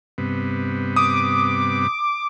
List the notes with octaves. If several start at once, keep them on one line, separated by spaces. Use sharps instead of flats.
G2 C3 B3
D6 D#6